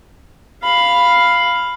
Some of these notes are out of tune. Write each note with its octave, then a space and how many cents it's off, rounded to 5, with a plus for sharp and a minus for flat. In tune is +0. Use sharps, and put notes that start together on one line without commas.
F5 +0 B5 +5